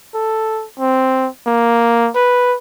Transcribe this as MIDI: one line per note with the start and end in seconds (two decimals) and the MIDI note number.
0.15 0.66 69
0.79 1.28 60
1.47 2.10 58
2.15 2.57 71